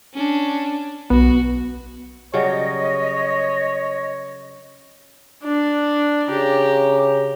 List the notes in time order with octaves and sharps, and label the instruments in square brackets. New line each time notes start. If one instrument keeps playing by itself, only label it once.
[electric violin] C#4 D4
[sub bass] B1 [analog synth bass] B3 [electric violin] F#4
[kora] C#3 F#3 G3 [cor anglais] C#5 [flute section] D#5
[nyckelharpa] D4
[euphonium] C#3 [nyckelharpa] G4 A#5